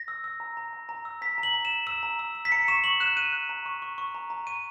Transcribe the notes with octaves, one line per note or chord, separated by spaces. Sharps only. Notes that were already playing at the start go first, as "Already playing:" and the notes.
Already playing: A#6
E6
E6
A#5
A#5
A#5
A#5
E6
A#5 B6
A#5
F#7
A#5
E7
A#5
E6 E7
A#5
E6
E6
B6
A#5 C#7
C#6 E7
C#6 F#7
F#6 E7
F#6 D#7
F#6
A#5
C#6
C#6
C#6
A#5
A#5
C#6 D#7